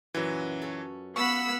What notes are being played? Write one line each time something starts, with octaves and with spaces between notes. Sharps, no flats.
F#2 A#2 E3 F#3 B4
C#4 A4
B3 F5 F#5 A5 B5 C#6 E6